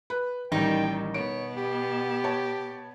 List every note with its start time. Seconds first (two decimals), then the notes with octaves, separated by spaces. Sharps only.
0.10 B4
0.52 A1 D#3 G3 D#4 G5
1.14 B2 B3 C#5 D7
1.57 G4
2.24 C#5 A5